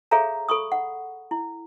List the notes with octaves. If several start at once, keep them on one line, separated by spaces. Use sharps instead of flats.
G#4 A4 C#5 E5 F5 A#5
A4 B5 C#6 D#6
F#5
E4